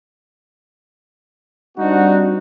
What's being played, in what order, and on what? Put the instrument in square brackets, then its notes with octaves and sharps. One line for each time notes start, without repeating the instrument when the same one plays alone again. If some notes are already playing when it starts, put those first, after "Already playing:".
[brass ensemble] G3 C4 D4 D#4 F#4